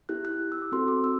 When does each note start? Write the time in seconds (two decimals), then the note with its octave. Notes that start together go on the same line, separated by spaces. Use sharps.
0.09 B3 E4 G4 F#6
0.25 F#6
0.52 E6
0.62 D6
0.72 C4 F#4 A4 C6
0.88 D6
1.04 E6